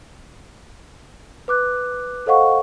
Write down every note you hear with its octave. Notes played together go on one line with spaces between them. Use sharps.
B4 D6 F#6
A4 C5 D#5 F5 F#5 C#6